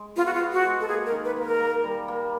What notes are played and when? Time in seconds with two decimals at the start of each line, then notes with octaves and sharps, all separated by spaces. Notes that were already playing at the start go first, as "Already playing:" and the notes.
Already playing: G#3
0.16 B3 F4
0.26 F#4
0.33 F4
0.40 B3
0.52 F#4
0.65 G#3
0.80 A4
0.88 A#3 G#4
1.06 A#4
1.12 D#3
1.25 B4
1.37 A#3
1.42 A#4
1.60 A#3
1.84 G3
2.08 A#3